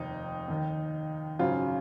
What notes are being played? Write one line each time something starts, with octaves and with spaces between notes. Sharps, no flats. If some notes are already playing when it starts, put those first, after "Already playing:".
Already playing: F1 D#2 D#3 D#4
D#2 D#3
G#1 F#2 C#3 F4